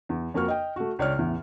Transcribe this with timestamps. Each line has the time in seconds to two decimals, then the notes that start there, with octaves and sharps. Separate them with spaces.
0.09 E2
0.34 F2 A#3 F#4 A#4 C#6 F6
0.48 D#5 G5
0.76 A3 F#4
0.99 C#2 C#5 D5 F6
1.18 A1 E2